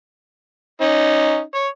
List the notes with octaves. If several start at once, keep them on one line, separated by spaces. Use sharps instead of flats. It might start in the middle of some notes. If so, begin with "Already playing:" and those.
C#4 D#4
C#5